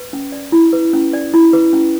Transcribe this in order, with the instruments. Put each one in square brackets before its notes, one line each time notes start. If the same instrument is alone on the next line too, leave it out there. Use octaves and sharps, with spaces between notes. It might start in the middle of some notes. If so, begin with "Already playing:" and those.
Already playing: [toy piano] B4
C#4
D5
E4
B4
C#4
D5
E4
B4
C#4